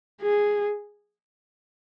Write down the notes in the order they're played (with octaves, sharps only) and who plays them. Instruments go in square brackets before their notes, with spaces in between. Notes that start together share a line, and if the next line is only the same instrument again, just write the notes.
[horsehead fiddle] G#4